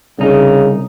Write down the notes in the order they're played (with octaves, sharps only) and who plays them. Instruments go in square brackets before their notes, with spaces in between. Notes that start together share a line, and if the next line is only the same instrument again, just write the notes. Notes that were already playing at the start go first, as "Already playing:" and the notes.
[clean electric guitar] C2 D#4 [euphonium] C#3